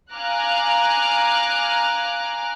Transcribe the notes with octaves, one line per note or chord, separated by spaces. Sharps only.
F5 G#5 A#5 D6 F6 F#6